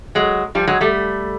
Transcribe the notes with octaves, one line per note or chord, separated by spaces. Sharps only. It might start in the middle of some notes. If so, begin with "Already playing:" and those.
F#3 G#3
F3 G3
F#3 G#3
G3 A3